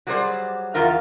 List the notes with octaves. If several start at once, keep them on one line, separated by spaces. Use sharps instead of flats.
F#3 G3 A3 G#4 C5 D5
E2 F3 F4 A#4 F5